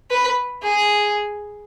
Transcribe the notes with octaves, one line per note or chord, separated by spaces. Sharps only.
B4
G#4